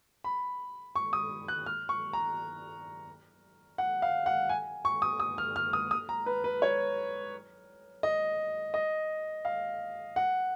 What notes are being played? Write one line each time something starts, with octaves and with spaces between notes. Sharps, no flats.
B5
C#6
D#6
F#6
F6
C#6
A#5
F#5
F5
F#5
G#5
C#6
D#6
D#6
F6
F6
D#6
D#6
A#5
B4
B4
C#5
D#5
D#5
F5
F#5